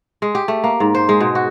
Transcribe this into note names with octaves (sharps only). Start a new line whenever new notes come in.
G#3
G4
A3
A#3
G#2
C5
G#3
B2
F#4